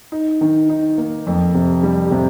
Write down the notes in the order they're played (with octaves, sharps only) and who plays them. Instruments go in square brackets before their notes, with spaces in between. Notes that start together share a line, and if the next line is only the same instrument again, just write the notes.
[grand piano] D#4
D#3
D#4
A#3
F2
C3
G3
C3